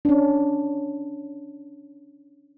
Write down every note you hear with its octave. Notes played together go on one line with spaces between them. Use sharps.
C#4 D4